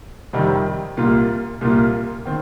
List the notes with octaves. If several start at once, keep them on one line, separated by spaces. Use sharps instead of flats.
F2 C3 D#3 G3 D#4
C2 A#2 A#3 F4
C2 A#2 A#3 F4
D#3 C4